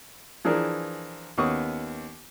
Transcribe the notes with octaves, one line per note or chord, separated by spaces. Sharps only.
E3 F3 D4 G#4 A#4
D#2 B3 C#4 C#6 D#6